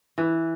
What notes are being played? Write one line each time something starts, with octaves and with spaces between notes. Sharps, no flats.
E3